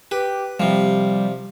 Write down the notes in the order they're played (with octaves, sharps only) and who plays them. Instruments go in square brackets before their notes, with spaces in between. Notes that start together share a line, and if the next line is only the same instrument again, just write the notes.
[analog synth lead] G4 [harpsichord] B4
[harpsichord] C3 F3 [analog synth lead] G3